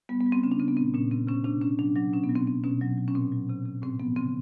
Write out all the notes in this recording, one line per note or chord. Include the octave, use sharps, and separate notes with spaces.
G3 B3
B3
G3
C4
C#3 C#4
D4
C#3 C4
B3
A#2 C4
A#2 C#4
C3 C4
C3 C#4
C3 D4
C3 C#4
F#3 D4
F#3 D4
B2 C#4
B3
F#3
C4
F#3 C4
B2 C#4
F#3
F#3
C#4
A#2 C4
F#3
C3
C3
A2 C4
F3 B3
C#3 C4